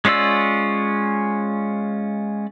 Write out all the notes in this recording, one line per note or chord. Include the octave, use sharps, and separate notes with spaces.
G#3 C#4 F4 D5 E6